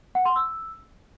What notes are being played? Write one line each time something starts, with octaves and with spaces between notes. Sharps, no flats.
F#5
C6
E6